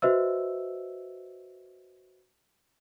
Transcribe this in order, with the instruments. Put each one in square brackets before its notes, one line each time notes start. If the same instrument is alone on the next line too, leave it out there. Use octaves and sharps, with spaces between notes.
[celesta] F#4 B4 C5 D#5 E5 E6